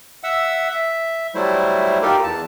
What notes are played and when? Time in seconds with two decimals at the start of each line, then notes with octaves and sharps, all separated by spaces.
0.24 E5 F#5 E6
0.70 E5
1.35 F#3 G3 A3 E4 C5
2.02 D#4 F4 G4 A4 A#4
2.24 E2 A5